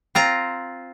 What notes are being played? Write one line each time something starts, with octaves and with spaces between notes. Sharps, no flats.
C4 F4 A#5